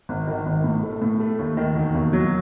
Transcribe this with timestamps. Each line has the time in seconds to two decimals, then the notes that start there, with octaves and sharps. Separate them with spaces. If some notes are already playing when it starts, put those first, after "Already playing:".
0.09 G#1
0.28 D#3
0.46 G#1
0.64 A2
0.83 A3
1.02 A2
1.20 A3
1.39 D#2
1.57 D#3
1.76 E1
1.95 D#2
2.13 F#3